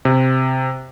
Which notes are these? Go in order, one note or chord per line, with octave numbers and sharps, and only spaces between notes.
C3